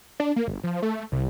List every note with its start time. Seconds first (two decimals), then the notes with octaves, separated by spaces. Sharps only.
0.20 D4
0.36 A#3
0.48 G1
0.64 F3
0.82 A3
1.12 C2